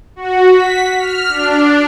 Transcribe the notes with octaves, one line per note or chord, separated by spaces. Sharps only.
F#4
B6
F6
D4